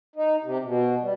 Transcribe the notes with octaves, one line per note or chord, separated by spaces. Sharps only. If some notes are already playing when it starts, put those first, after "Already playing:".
D#4
C3
B2
G3